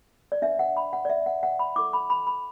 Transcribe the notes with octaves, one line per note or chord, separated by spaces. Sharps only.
D5
D4 B4 E5
F#5
B5
F#5
D5
E5
F#5
F#5
B5
E4 A4 D6
B5
B5
B5